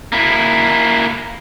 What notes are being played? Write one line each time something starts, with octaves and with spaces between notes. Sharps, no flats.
A#3 E4